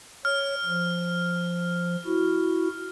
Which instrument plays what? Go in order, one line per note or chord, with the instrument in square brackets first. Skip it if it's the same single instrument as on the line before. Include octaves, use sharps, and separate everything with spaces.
[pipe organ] C#5 [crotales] F6
[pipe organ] F3
E4 F#4